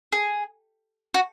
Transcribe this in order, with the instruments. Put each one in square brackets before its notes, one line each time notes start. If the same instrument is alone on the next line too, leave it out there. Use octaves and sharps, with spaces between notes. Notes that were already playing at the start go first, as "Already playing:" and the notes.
[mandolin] G#4
F#4